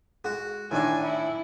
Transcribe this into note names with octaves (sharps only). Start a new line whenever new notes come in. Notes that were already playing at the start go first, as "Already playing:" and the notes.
G#3 F#4
A2 D#3 D4 G#5
E4